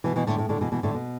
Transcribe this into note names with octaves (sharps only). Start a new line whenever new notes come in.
B2 E3
B2 E3
A2 D3
A2
A2 D3
B2 E3
B2 E3
A2 D3
B2